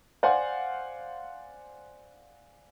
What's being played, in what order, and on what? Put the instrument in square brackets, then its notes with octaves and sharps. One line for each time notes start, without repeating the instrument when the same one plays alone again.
[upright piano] C5 D5 F5 F#5 G#5 C6